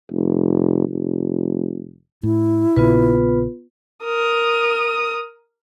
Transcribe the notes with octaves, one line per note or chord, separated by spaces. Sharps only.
F1
F1
A2 E4
A#1 A#2 C#3 B3 F4 B4
A#4 D#6